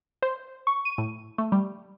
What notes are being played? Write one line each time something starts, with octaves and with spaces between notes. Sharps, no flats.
C5
C#6
D#7
A2
A3
G3